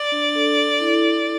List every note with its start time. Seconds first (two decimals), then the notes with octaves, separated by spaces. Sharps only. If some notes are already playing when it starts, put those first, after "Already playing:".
Already playing: D5
0.12 D4
0.35 A4
0.57 A4
0.80 E4
1.03 E4